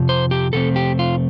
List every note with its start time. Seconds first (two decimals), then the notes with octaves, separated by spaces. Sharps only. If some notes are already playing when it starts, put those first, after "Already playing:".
Already playing: F2 C3 F3
0.09 C5
0.31 G4
0.53 F2 C3 A3 C4 A4
0.76 G4
0.99 F4